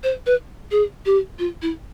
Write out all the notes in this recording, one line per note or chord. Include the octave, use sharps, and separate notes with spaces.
C5
B4
G#4
G4
F4
E4